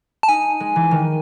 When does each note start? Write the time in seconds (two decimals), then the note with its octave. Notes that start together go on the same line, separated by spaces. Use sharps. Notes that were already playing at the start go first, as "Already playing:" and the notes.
0.23 A5
0.28 D#4 G#5
0.60 G#3
0.76 E3
0.91 D#3